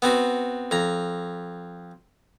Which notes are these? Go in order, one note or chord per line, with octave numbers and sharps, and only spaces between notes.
B3 C4 F#4
F2 A#5